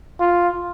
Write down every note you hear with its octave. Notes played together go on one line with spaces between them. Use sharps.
F4